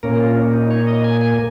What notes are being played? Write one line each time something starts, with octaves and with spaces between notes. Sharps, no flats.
A#2 A#3 C#4 A#4
F4
C#4
D#4
C#5
D#5
G#5
G#5